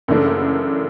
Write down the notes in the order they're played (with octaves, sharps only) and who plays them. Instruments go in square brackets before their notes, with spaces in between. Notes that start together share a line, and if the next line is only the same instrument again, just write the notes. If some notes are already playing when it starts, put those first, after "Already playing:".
[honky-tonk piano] F#2 C#3 E3 A3 D4